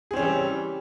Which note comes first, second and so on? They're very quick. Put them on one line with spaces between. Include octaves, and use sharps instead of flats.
G#4 C4 C#4 E3 G3